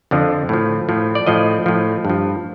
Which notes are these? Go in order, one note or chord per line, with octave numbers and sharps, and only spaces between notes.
F2 D3 F3
A2 F3
A2 F3
D5
A2 F3 D#5
A2 F3
G2 F3